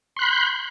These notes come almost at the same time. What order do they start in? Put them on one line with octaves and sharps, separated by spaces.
C6 F#6 B5 G6